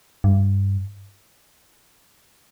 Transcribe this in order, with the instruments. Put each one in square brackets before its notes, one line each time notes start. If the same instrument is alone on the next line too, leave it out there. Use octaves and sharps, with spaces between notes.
[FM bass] G2